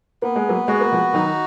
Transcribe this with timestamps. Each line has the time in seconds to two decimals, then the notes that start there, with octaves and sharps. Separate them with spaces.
0.22 A#3 B3
0.36 G#3
0.49 F#3 A#3
0.68 G#3 F#4
0.81 A#3
0.92 F3 G#3
1.13 D#3 F#3 D#4